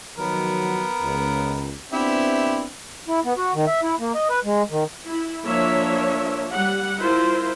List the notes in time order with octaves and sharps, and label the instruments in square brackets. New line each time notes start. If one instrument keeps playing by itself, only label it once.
[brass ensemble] D#3 F3 F#3 [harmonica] B3 A#4
[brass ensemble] C#2
[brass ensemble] B3 C4 D4 [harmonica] E4 G4 E5
[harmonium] E4
B3
F#4
D#3
E5
E4
A#3
D#5
B4
G#3
D#3
[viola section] E4
F3 A#3 D4 C#5 E5
G3 F#5
E4 F4 A#4 C5